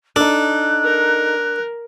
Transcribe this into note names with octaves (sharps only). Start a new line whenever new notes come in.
D4 D#4 A4 F#6
A#4